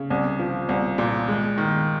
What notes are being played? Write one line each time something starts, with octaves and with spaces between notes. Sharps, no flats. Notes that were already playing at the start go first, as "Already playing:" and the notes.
Already playing: C#3
C2
F3
C2
A#2
G#3
D#3